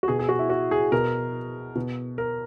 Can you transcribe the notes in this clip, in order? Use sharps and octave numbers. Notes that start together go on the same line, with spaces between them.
F#4
B2 G#4
G#4
F#4
E4
F#4
G#4
B2 A#4
B2
A#4